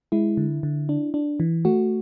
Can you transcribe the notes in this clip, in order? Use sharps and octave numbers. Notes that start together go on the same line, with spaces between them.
G#3 E4
D3
D3
D4
D4
E3
A3 F#4